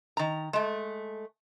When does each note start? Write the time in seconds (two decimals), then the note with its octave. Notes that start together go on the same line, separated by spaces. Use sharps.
0.17 D#3 A#5
0.53 G#3 A3